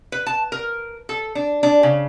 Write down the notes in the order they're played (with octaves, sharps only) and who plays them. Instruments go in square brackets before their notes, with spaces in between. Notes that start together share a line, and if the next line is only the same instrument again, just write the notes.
[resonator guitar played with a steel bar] B4
A5
A#4
A4
D4
D4
C#3